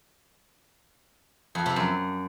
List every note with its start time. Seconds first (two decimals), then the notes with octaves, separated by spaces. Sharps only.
1.55 F2
1.66 C3
1.76 F#2